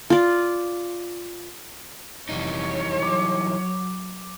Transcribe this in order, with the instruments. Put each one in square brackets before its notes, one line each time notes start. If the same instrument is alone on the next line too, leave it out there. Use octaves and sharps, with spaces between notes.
[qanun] F4 D5
[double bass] F1 [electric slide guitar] E3 G3 D#4 [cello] C#5
[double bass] F#3 [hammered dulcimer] D6